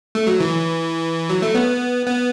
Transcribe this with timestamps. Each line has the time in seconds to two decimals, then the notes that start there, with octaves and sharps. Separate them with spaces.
0.15 A3
0.27 F#3
0.40 E3
1.30 F#3
1.42 A3
1.54 B3
2.06 B3